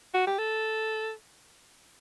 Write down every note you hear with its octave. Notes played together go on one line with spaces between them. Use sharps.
F#4
G4
A4